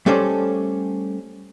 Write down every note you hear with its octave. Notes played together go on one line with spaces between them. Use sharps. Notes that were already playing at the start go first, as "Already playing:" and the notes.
G3 A3 C#4 A4 C5 D5